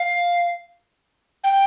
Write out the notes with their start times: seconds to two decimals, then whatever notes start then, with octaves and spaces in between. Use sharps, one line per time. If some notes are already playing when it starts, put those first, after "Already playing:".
Already playing: F5
1.44 G5